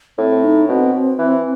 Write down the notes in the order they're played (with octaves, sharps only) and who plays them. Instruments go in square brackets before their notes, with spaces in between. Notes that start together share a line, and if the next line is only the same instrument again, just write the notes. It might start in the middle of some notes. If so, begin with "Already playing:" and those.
[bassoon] A2 [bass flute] C4
[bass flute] D#4
[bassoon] B2 [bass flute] C4
[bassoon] E3